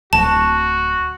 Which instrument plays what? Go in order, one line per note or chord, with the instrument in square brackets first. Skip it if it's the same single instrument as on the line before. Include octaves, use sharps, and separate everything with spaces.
[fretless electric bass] D1 [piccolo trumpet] F#4 [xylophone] A5